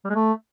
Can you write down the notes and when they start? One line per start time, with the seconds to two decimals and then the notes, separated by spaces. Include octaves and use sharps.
0.05 G3
0.10 G#3
0.15 A3